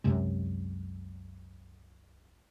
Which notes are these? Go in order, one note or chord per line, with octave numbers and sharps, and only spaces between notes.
C2 F#2 C3 G#3